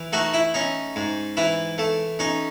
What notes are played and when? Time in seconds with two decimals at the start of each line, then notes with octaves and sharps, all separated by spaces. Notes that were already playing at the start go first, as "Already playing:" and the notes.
Already playing: E3
0.13 A3 D#4 F#4
0.34 E4
0.54 C#4 D#4
0.96 G#2
1.37 E3 E4
1.78 A3
2.19 C#4 D#4